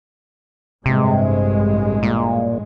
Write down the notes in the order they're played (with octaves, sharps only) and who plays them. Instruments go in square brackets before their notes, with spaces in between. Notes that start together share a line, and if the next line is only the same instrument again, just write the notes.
[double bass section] A1 G2 G#3 [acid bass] C3
[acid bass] A#2